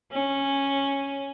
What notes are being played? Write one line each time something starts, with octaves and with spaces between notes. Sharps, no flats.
C#4